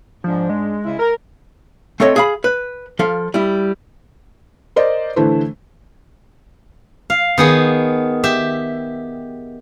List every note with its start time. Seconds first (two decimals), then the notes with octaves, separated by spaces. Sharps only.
0.24 G#2 F3 D4
0.50 G#3
0.84 C#3 E4
0.99 A#4
2.00 A3 C4 A4 C#5 D#5
2.16 G#4 F5 B5
2.44 B4
2.99 F3 A4 F5
3.34 G3 E4
4.76 A#4 C5 D5 D#5
5.16 D3 E3 A3 E4 C5
7.10 F5
7.38 D#3 B3 G#4
8.24 G4 E5